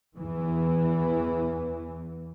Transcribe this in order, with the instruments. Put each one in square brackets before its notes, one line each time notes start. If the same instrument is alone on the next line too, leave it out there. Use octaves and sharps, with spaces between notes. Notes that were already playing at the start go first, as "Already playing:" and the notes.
[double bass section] E2 E3